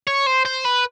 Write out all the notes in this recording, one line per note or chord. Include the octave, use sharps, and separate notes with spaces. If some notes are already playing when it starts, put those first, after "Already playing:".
C#5
C5
C5
B4